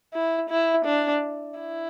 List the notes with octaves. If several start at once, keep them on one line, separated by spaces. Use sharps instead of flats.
E4
E4
D4
E4